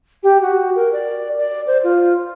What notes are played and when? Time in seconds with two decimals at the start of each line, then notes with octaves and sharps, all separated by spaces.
0.23 G4
0.42 F#4
0.76 A#4
0.93 D5
1.38 D5
1.67 C5
1.84 F4